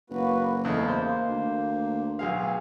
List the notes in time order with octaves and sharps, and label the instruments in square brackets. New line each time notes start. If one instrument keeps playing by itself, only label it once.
[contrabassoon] F#1 [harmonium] A#3 F#4 B4
[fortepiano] E2 C#3 A3 [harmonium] G#3 D#4
[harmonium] A#3 [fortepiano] C5
[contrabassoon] D2
[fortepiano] B1 G#4 F5